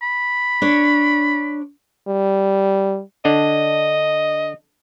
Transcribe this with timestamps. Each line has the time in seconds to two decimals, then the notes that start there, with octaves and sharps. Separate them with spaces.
0.02 B5
0.62 D4 C#5
2.08 G3
3.25 D3 D4 D#5